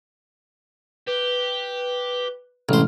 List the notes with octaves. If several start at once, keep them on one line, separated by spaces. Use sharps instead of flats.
G4 B4
A1 C3 G#3 C#4 C5 F6